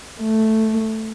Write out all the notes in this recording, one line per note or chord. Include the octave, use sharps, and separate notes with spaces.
A3